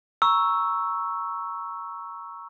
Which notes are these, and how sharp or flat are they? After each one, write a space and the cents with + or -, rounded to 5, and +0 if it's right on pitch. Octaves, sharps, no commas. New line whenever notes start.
A#5 +10 C#6 +0 E6 +0